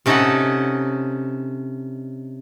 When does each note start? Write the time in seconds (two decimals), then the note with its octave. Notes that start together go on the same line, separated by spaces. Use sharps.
0.06 C3 C#4 D#4 A4 D#5 F#5